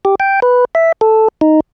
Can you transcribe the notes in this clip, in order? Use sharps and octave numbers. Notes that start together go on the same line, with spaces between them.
G4
G5
B4
E5
A4
D#4